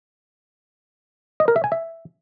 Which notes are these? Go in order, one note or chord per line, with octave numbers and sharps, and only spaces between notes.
D#5
A#4
E5
G#5
E5